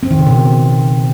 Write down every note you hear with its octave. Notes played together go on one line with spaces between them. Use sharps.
C4
D#3
C#3
B2